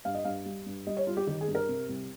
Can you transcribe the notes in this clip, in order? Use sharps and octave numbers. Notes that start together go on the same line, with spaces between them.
G2 F5
D#5
G2 F5
G3
G2
G3 D#5
C#5
G3 F4
G4
D#3 G4
G#4
G2
A#4
C3
C2